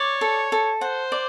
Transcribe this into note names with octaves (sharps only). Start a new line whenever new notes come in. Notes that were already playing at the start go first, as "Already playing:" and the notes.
Already playing: C#5 D5
A4
A4
C5 F#5
D5